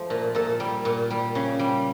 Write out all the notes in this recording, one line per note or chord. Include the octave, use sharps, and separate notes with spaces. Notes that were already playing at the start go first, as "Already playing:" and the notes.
Already playing: F3 A3
A#2
A#2 A4
G3
A#2
G3
C#3
G3